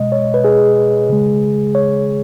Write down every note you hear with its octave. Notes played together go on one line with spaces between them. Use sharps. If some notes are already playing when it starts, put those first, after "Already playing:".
Already playing: B2 G#3 D#5
C#5
B4
G#4
C#3 G#3
C#5